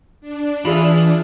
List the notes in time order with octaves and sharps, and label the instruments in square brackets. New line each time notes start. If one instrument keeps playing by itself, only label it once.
[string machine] D4
[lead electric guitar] E3 B5 [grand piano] F4 G#4 E5